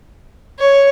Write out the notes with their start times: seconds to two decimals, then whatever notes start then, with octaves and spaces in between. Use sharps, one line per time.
0.59 C#5